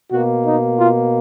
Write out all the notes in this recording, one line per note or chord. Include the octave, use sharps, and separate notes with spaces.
B2 A#3 F#4
D#4
F4